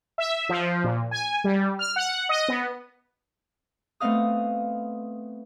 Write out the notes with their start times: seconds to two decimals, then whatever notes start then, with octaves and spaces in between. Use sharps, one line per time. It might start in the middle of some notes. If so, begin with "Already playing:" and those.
0.18 E5
0.49 F3
0.84 A#2
1.11 G#5
1.44 G3
1.79 F6
1.96 F#5
2.29 D#5
2.48 B3
4.00 A3 B3 C4 D#5 F5 D#6